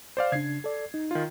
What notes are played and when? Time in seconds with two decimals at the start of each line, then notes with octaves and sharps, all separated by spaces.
0.17 C5 D5 F5
0.32 C#3 D4 G#6 C7
0.64 A4 D5
0.94 D#4
1.11 D#3 F4